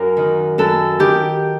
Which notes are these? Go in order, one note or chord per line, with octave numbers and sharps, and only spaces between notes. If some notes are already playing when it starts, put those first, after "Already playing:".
Already playing: F#2 A#4
D#3
F#2 A4
D#3 G4